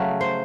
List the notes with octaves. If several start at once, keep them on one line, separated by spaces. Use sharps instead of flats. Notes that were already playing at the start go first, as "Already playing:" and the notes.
Already playing: C#3 F#3 A3
C5